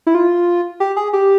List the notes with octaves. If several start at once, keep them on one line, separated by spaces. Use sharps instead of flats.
E4
F4
G4
G#4
G4